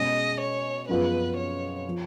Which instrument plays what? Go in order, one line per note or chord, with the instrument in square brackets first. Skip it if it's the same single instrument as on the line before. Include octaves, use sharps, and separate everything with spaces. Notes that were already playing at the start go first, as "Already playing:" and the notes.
Already playing: [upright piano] B2 G#3 C#4 G#4 [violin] D#5
[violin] C#5
[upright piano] F#2 F3 B3 F4 G#4 [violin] B4
[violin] C#5
[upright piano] F3